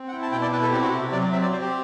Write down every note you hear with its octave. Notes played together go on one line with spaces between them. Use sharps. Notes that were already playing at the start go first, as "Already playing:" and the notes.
Already playing: C4
F#5
E4 G5
A5
B2 G5
D5
E4 B4
A4
C4 G4
F#4
C3 G4
F#3 D5
C4 E5
D5
C4 C5
G4